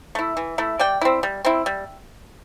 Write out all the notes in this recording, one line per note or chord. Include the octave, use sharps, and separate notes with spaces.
A3 E4
E3
A3 E4
G3 D5 G5
C4 E4
G3
C4 E4
G3